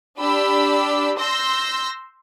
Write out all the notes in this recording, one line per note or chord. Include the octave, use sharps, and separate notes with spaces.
D4 G4 B5 E6
C6 E6 G6 A#6